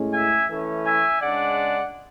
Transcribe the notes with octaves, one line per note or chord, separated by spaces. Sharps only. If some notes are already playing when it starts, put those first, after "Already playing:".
Already playing: A2 G#3 C#4
E5 G#5
E3 A3 C#4
E5 G#5
C#3 G#3 D4 D5 F#5